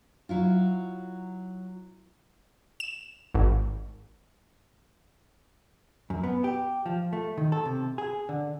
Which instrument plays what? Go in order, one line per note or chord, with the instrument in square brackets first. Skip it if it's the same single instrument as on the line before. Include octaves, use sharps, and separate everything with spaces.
[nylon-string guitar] F#3 E4 F4
[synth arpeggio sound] E7
G#1
[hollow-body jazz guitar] F#2
B3
G4
F3
A3
D#3
A4
C3
G#4
D3